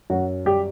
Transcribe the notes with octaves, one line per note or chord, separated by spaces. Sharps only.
F#2 F#4
G3 G4